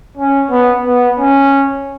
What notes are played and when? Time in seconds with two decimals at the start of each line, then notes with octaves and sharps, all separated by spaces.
0.17 C#4
0.51 B3
0.85 B3
1.19 C#4